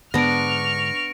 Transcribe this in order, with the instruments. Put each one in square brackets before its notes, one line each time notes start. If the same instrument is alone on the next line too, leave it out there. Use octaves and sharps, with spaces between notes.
[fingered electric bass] G#2 D3 [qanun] B3 D4 [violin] C#6 F6 [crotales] A#6 D7